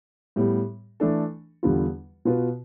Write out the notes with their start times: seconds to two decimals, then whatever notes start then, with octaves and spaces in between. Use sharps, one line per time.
0.36 A2 G3 B3
1.00 E3 A3 D4 A4
1.63 E2 D3 G3 B3 F4
2.25 B2 B3 F4 B4